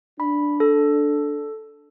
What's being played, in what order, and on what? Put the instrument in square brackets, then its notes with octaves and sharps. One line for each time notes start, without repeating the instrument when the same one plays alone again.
[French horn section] D4 [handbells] B5
[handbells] A4